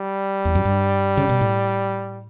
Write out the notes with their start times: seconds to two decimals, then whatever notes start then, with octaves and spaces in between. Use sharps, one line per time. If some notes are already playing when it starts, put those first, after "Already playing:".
Already playing: G3
0.45 E2
0.55 F#2
0.65 G2
1.17 C#3
1.29 B2
1.41 A2